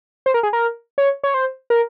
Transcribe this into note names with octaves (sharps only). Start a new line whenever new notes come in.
C5
A#4
G#4
A#4
C#5
C#5
C5
A#4